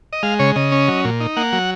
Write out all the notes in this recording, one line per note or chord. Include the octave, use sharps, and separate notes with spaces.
D#5
G#3 F5
C#3 C#5
C#3 D#5
C#4
F#3
A#2
D#4
A#3 F#5
F#3